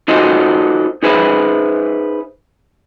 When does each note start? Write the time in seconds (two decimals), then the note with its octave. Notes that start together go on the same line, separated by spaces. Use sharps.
0.08 D#4 F4 F#4 A4 C5 D#5
1.03 D#4 G#4 B4 C5 E5